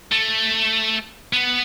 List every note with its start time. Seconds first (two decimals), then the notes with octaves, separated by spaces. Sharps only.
0.12 A3
1.33 B3